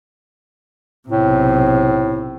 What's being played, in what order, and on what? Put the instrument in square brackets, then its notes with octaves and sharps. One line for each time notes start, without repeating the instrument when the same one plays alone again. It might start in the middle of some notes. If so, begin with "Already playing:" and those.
[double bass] B1 C3 [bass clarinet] A2